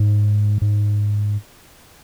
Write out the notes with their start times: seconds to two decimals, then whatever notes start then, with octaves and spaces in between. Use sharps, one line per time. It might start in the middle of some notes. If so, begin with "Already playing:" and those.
Already playing: G#2
0.61 G#2